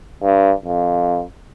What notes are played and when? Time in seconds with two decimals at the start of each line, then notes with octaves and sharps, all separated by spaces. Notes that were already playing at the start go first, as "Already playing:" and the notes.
0.23 G2
0.65 F2